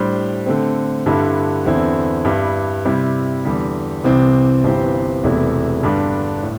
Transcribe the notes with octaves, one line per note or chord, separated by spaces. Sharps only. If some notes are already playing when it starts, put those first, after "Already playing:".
Already playing: A2 G3 D4 C5
D3 A3 C4
G2 D3 G3 E4
E2 D3 C4 E4
G2 G3 E4
C3 G3 E4
E2 D3 G3
C2 C3 E3 C4
G1 G2 E3 C4 G4
E1 E2 C3 A3 E4
G2 D3 G3 D4
A2